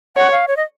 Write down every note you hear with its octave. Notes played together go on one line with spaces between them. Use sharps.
C#5 F#5
F5
C#5
D#5